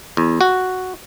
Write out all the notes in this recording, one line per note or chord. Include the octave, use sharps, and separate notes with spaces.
E2
F#4